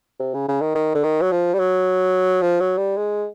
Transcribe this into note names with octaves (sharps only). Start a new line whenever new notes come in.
C3
C#3
C#3
D#3
D#3
D3
D#3
F#3
F3
G3
F#3
F3
F#3
G3
G#3